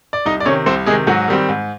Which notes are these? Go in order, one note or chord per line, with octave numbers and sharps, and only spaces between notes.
D5
C2 D#4 D#5
D5
C3 D#3 C#4 C#5
C2 C4 C5
C3 D#3 G#3 G#4
G#2 F#3 F#4
D#3 G3 C4
G#2